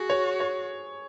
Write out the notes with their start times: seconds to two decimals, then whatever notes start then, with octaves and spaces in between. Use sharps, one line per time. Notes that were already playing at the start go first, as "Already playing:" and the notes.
Already playing: F#4 G#4
0.10 C#5
0.40 C#5